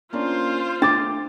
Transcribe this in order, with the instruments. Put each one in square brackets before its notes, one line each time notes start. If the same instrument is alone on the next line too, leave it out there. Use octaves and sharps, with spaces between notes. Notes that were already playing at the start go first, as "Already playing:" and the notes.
[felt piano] A#3 C#4 D4 [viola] F4 C5
[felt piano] A3 [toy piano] D4 [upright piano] D6 A6